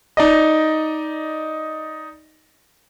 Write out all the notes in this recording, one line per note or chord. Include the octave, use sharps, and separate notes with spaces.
D#4 D5 D#5